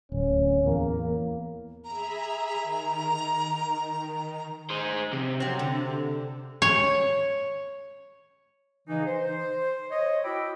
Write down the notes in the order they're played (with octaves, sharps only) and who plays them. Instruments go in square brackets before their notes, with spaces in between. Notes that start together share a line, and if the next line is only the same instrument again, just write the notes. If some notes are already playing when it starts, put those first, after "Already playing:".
[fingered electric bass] D1 [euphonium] C#4
[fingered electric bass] E2 [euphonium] A#3
[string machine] G#4 E5 B5 [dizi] A#5
[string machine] D#3
[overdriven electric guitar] G#4 C5
C3
[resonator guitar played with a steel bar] F#3 C4
D3
[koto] C#5
[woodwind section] C#3 E3 D#4
C5
C#5 D#5
E4 F#4 G5 B5 D6 E6